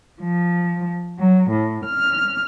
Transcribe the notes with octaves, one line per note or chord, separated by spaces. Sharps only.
F3
F#3
A2
F6